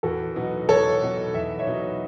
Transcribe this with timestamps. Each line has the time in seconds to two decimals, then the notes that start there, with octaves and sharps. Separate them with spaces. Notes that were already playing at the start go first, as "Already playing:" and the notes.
0.03 E2 F#4 A4
0.36 B2 F#3 B3 D#4
0.69 E2 A4 C#5
1.01 B2 F#3 B3 D#4
1.34 E2 E5
1.59 C#5 E5
1.67 B2 F#3 B3 D#4